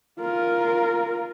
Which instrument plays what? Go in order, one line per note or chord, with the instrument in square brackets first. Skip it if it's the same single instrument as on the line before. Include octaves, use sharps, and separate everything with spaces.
[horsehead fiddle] F4 A#4